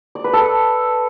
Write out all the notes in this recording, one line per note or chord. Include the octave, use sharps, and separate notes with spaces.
D5
B4
A4